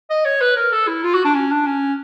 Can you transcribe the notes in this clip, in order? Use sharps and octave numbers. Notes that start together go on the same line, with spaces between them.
D#5
C#5
B4
A#4
A4
E4
F4
F#4
D4
C#4
D4
C#4